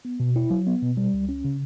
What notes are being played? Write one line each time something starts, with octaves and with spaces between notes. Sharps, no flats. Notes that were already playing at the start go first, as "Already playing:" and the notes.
B3
B2
E4
F#3
B3
B2
G3
C#2
C#4
C#3